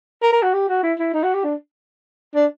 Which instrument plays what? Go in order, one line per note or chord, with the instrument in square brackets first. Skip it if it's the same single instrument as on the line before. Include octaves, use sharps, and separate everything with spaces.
[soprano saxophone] A#4
A#4
F#4
G4
F#4
E4
E4
D#4
F#4
G4
D4
D4